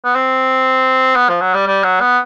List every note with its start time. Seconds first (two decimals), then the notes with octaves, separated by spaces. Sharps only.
0.05 B3
0.15 C4
1.16 B3
1.29 F3
1.41 F#3
1.54 G3
1.67 G3
1.84 F#3
2.01 B3